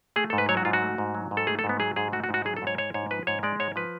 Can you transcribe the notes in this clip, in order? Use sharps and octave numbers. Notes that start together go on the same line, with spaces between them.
A3 G#4
G#2 A4
B4
F#3 C#5
F#4
G#2 F4
F#4
A3
G#2
F#3
G#2
A4
A3 G#4
A4
G#2
B3
F#3 G#4
G#2 G#4
A3 F#4
F#4
G#2
F#4
F#3 G#4
A4
G#2 C#5
G#3 C#5
G#2 C#5
F3 B4
G#2 C#5
G#3 D5
G#2 C#5
F3 B4